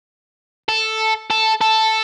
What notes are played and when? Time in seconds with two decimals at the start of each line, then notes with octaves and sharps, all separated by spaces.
0.69 A4
1.31 A4
1.61 A4